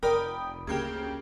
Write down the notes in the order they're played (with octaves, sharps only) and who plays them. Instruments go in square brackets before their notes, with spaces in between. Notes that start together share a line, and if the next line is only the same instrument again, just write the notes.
[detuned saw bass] F1 [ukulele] A#4 [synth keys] D5 B5 D#6 [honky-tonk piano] G5
[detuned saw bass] D2 [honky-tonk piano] C#3 A#3 G5 [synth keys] G4 G6 G#6